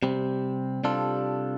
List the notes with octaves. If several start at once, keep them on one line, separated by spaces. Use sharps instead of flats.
C3 G3 C4
C3 G3 D4 F4 A4